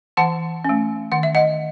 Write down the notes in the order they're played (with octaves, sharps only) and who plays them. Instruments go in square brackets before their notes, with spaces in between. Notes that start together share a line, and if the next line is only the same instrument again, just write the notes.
[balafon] E3 F#5 A5
A3 C#4
D#3 F#5
E5
D#5 F#5